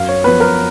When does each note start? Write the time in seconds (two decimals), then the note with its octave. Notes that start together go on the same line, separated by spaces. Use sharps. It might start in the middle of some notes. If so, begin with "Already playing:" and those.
Already playing: F#2 F5
0.09 C#5
0.24 F3 B3 B4
0.40 A#4